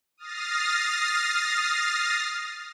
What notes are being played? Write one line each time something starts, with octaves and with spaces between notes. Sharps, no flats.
D#6 F6 A6 A#6 C7